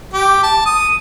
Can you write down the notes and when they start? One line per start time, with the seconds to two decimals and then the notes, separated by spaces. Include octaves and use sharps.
0.13 G4
0.43 A5
0.66 D#6